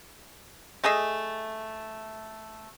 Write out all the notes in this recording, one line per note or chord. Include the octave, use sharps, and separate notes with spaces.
A3 G#4 D#5 E5